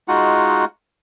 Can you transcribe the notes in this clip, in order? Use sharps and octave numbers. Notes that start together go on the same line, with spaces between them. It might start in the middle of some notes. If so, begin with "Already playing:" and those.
G#3 D#4 F4 F#4 F#5